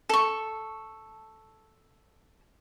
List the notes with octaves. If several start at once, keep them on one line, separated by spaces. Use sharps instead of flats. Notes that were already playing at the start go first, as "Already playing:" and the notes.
A4 C#6